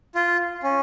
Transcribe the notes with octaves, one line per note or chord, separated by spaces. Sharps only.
F4
C#4